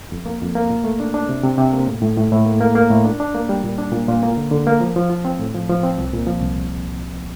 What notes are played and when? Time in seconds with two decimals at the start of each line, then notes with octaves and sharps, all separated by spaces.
0.12 F2
0.26 A#3
0.41 F2
0.55 A#3
0.70 A#2
0.84 A3
1.00 D4
1.14 D4
1.29 C3
1.44 C3
1.58 C3
1.73 A#3
1.87 A2
2.02 A2
2.17 A2
2.32 A2
2.46 A#3
2.61 A#3
2.75 A#3
2.90 A2
3.04 D4
3.20 D4
3.35 A#3
3.49 G3
3.64 A#2
3.78 D4
3.92 A#2
4.08 A#2
4.23 A#3
4.37 D3
4.52 D3
4.67 A#3
4.81 F3
4.96 F3
5.10 F4
5.25 C4
5.39 A2
5.54 F3
5.69 F3
5.83 C4
5.98 C2
6.13 A#2
6.27 F3
6.42 C2